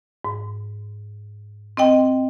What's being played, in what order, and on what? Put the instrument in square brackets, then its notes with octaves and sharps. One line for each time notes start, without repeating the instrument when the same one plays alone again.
[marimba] G#2
C4 D#5 G5